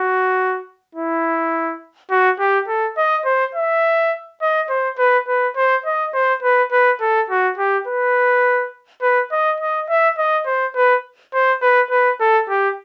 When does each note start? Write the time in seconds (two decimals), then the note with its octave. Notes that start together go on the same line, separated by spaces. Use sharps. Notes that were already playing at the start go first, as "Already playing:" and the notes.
Already playing: F#4
0.95 E4
2.11 F#4
2.39 G4
2.68 A4
2.97 D#5
3.25 C5
3.55 E5
4.42 D#5
4.70 C5
4.98 B4
5.28 B4
5.56 C5
5.86 D#5
6.14 C5
6.43 B4
6.72 B4
7.01 A4
7.30 F#4
7.58 G4
7.88 B4
9.02 B4
9.32 D#5
9.61 D#5
9.89 E5
10.18 D#5
10.46 C5
10.75 B4
11.34 C5
11.62 B4
11.91 B4
12.20 A4
12.49 G4